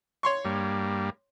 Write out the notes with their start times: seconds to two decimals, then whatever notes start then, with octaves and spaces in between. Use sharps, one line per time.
0.23 C#5 C6 C#6
0.45 G2 G3 A#3